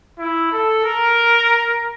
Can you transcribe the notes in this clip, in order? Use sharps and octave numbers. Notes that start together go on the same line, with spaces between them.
E4
A4
A#4